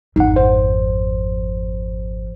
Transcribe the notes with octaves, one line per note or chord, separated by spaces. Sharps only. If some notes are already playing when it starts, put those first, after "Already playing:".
G#1 F2 D#4 F#5
C5